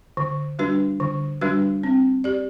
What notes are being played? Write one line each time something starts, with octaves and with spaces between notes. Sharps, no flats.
D3
G3 D4 F#4 B4
D3
G3 D4 F#4 B4
C4
G4 D5